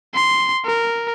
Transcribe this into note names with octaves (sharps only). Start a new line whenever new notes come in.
C6
A#4